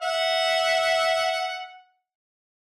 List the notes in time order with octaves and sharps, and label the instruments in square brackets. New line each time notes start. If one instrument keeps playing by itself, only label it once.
[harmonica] E5 F#5